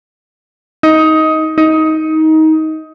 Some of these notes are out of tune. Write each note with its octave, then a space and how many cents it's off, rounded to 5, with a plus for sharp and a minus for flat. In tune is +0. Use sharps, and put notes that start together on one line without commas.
D#4 +15
D#4 +20